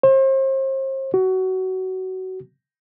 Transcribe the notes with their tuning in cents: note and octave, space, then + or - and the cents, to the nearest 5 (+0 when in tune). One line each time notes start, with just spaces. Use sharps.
C5 +40
F#4 +20